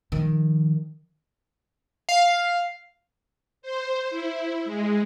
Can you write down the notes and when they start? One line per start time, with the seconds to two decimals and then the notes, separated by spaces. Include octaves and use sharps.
0.12 D#3 F3
2.09 F5
3.62 C5
4.10 E4
4.65 G#3